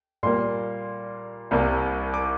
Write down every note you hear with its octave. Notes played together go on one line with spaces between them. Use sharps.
A#2 G3 A#3 C6
C2 C3 G3 A#3
D6